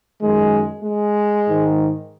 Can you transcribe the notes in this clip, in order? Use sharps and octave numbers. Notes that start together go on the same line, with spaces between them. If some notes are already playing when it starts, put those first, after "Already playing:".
F#2 D#3 G#3
G#3
G#2 D#3